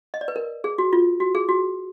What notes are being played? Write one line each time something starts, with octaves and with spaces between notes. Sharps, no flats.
D#5
D5
B4
A#4
G#4
F#4
F4
F#4
G#4
F#4